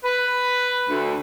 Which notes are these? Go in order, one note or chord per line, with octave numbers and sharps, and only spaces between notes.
B4
D2